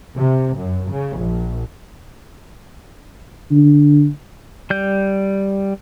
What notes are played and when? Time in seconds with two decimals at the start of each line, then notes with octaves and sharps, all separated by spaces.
0.17 C3
0.57 F#2
0.91 C#3
1.19 A#1
3.51 D3
4.70 G3 G6